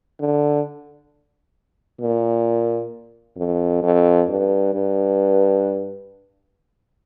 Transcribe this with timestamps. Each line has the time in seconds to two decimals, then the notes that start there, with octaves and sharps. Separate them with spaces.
0.20 D3
2.01 A#2
3.37 F2
3.82 F2
4.28 G2
4.74 G2